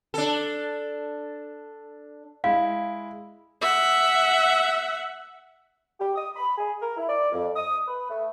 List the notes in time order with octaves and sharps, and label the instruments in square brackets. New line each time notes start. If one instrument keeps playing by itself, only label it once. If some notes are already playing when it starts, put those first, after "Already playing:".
[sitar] D4 A4
[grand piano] G#3 E4 [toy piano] F5
[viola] E5 F#5
[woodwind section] G4
D#6
B5
G#4
A#4
E4
D5
F2
D#6
B4
A3